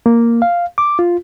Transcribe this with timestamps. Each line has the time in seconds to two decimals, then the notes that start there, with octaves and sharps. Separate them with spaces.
0.06 A#3
0.42 F5
0.78 D6
0.99 F4